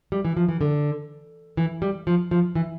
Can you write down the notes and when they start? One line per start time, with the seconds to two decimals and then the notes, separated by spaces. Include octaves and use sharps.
0.12 G3
0.25 E3
0.37 F3
0.49 E3
0.61 D3
1.57 E3
1.82 G3
2.07 F3
2.31 F3
2.55 E3